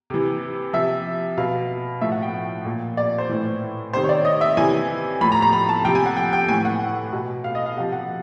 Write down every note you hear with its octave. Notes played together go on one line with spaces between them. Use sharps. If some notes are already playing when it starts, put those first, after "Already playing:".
C3 E3
C3 F3 E5
B2 F5
A2 F3 E5
F#5
G5
A#2 F3
D5
C5
A2 E3
C3 D#3 C5
C#5
D5
D#5
E5
C3 E3 G#5
A2 F3 B5
A#5
A#5
B5
A5
C3 F3 G5
G#5
F#5
G5
G5
A2 E3 G#5
F#5
B2
F5
D#5
F5
C3 F3 F#5
F#5